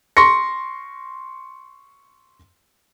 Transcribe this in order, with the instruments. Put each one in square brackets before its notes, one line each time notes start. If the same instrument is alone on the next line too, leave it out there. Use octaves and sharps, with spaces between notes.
[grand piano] C6 C#6 A#6 C#7